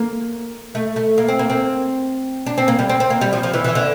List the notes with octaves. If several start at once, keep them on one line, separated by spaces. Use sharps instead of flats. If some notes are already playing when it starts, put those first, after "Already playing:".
Already playing: A#3
A3
A3
A#3
C4
A#3
C4
D4
C4
A#3
G3
C4
C4
A#3
G3
F3
F3
E3
E3
D3